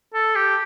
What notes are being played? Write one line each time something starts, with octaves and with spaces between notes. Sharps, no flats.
A4
G4